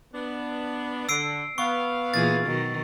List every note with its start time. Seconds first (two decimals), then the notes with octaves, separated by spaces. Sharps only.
0.13 B3 D4
1.09 D3 E6 C7 D7
1.58 B3 F5 C#6
2.14 A#2 E3 G#4 A6
2.47 B2 D#3 F#3